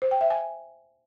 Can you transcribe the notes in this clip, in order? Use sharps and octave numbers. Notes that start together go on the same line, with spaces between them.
C5
G5
E5
G#5